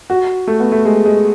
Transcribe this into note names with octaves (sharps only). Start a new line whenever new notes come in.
F#4
A3
B3
A3
G#3
G#3